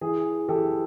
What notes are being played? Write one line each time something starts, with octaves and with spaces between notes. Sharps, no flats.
E3 G#4
E3 G4 A4